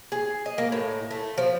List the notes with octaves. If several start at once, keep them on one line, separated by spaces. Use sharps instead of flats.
G#4
D#5
A#3
A2
A3
F3